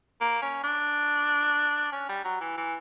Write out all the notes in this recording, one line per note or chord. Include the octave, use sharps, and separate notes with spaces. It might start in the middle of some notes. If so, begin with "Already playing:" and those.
A#3
C#4
D4
C#4
G3
F#3
E3
E3